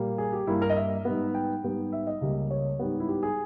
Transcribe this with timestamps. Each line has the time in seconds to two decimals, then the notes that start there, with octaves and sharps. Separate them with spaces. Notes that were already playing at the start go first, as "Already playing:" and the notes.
Already playing: A#2 G3 A#3
0.18 G#4
0.32 G4
0.47 G2 G3 A#3 E4
0.62 A#4
0.69 D#5
0.76 E5
1.05 G#2 G3 B3
1.34 G5
1.63 G#2 G3 B3
1.92 E5
2.07 D#5
2.21 C#2 C#3 G3 A#3
2.51 C#5
2.79 G#2 G3 B3
3.00 E4
3.08 G4
3.23 G#4